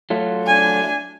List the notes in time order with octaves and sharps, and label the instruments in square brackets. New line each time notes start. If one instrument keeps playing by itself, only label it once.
[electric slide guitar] F#3 A3 F4
[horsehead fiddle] D4 G#5